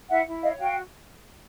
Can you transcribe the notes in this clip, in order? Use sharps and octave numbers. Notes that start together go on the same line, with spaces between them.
E4 E5 F#5
E4
C#5 D#5 F5
F#4 F5 G5